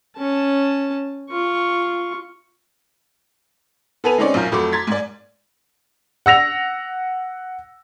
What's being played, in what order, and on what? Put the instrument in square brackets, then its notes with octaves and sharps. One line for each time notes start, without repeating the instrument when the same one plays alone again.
[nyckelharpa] C#4 A5
F4 C#6
[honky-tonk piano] B3 A4 B4 G#5 D#7 F7
G#3 C4 C#4 D#4 C#5 D5
B1 F#2 F4 A#5 G6
F2 F#3 A3 B5 C6 D6
A#5 C6 G#6 A6 B6
G#2 D5
[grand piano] F#5 E6 A#6 F7